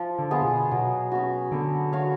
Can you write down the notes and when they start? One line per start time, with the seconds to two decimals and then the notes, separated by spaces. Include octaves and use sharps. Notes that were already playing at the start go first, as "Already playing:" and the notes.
Already playing: F3
0.18 D3
0.31 B3 F4 G#4
0.41 A2
0.44 B2
0.71 B2 F#3
1.12 C#4 F#4
1.52 D3 B3
1.93 F#4 C#5 F5